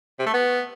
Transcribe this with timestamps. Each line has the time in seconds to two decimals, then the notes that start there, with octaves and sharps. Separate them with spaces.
0.19 C3
0.27 A3
0.34 B3